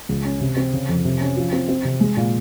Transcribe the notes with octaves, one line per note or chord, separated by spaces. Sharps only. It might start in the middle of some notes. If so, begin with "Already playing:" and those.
C#2
C#4
C3
C4
C#3
F2
C3
C#4
F3
C4
C4
C3
G#3
A#2